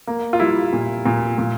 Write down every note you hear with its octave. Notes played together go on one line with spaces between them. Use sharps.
A#3
F4
G3 E4
A#2
A#2
A#2